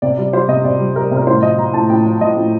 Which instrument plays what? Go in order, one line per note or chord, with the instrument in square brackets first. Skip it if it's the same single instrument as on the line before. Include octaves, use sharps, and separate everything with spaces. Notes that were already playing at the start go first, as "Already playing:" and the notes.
[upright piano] C3 D5
G3 D5
G3 C5
C3 D#5
C3 D5
G3
G3 A#4
C3
A#4
A2 C5
F3 D#5
F3 A#5
A2 A5
A2 G5
F3
F3 D#5
A2